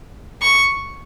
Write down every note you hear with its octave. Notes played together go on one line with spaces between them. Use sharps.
C#6